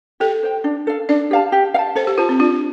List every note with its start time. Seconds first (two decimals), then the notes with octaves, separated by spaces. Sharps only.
0.20 G4 A4
0.43 C5 G5
0.64 D4
0.87 A4 F5
1.09 D4 D5
1.31 G4 F5 A5
1.52 G4
1.74 F5
1.79 A5
1.95 A4 C5
2.07 G4
2.18 F4 C5 A5
2.29 C4
2.39 D4 F4